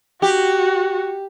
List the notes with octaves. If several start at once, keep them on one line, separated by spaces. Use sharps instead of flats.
F#4 G4